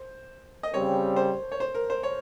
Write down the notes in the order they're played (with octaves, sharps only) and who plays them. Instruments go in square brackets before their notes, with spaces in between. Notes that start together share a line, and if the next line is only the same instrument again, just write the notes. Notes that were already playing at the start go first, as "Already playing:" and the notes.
Already playing: [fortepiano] C5
D#5
[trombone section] C#3 G3 C4 [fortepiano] C#5
[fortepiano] C5
C#5
C5
A#4
C5
C#5